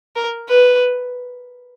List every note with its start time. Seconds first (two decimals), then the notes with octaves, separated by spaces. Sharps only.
0.16 A#4
0.49 B4